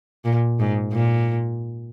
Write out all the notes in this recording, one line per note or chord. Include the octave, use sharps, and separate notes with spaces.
A#2
G#2
A#2